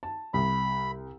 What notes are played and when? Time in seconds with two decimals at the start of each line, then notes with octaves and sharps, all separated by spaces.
0.03 A5
0.34 C2 B5